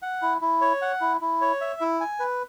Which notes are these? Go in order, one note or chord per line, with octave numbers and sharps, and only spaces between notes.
F#5
E4
E4
C#5
F#5
E4
E4
C#5
E5
E4
G#5
B4